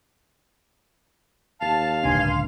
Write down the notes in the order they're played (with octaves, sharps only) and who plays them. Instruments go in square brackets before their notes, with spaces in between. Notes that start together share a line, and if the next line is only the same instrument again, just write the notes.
[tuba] D#2 [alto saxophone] F5 [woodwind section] A5
[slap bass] D1 C#2 D4 [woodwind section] G2 G#5 C6